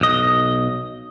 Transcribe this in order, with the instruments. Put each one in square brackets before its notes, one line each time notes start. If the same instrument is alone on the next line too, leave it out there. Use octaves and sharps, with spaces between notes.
[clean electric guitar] B1 D#5